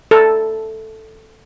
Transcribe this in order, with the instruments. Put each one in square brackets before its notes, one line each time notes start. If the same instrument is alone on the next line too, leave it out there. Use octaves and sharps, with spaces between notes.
[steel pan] A4